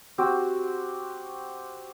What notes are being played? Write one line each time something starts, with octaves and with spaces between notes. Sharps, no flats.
C4 F#4 G4